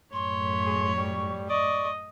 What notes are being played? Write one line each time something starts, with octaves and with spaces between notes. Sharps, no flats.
F#2 A2 C#5 C6
G#4
G3 C#6
D5 D#5 C#6